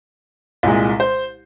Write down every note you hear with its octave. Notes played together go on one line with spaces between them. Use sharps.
C2 A#2 G#3
C5